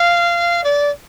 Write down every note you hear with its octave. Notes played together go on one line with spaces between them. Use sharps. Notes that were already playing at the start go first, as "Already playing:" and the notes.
Already playing: F5
D5